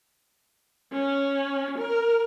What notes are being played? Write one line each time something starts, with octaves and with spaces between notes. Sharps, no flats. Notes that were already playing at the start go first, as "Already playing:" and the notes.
C#4
A#4